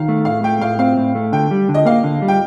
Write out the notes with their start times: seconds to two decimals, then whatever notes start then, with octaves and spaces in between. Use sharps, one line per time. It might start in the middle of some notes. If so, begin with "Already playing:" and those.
Already playing: D#3 F5
0.09 A3
0.25 A2 F5
0.43 A3 G5
0.61 A2 F5
0.79 C4 F5
0.97 A2
1.15 A3
1.32 D3 G5
1.51 G3
1.69 D3
1.74 D#5
1.86 A#3 F5
2.04 D3
2.22 G3
2.28 G5